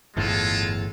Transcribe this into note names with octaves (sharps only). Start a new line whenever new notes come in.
G1 E2 A2 G#3 F4 A4